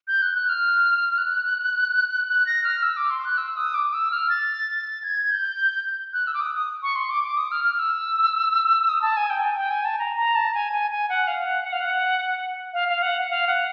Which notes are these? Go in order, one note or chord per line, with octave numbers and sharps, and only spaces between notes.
G6
F#6
F#6
F6
F#6
F#6
A#6
F6
E6
D6
C6
F#6
E6
D#6
D6
E6
F6
A6
G#6
G6
F#6
E6
D6
D#6
D#6
C#6
C6
D6
D6
D#6
F6
F6
E6
D#6
A5
G#5
G5
G#5
G5
G#5
A5
A#5
A#5
A5
G#5
G#5
G#5
F#5
F5
F#5
F#5
F5
F#5
F5
F5
F#5
F5
F#5